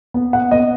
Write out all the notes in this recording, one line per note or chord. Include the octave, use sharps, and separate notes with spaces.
B3
F#5
B3 D#5